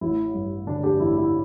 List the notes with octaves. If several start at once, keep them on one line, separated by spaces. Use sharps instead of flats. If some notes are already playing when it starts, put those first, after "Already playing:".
A1 E4
G2
D3 D4
D4 G4
A1 E4
E4